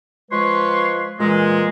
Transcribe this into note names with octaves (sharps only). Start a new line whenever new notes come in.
F3 G#3 B4 C#5 C6
A#2 E3 G#3